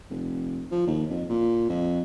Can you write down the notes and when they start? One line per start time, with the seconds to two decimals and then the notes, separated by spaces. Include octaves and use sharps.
0.10 F1
0.71 F3
0.87 D#2
1.10 F2
1.29 A#2
1.69 F2